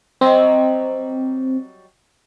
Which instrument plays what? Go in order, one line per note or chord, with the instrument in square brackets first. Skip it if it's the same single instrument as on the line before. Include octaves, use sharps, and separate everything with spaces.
[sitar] F#3 G3 D#5 [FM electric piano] C4